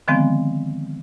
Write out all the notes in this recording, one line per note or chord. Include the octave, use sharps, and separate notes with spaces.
D3 D#3 F3 G#3 B3 C4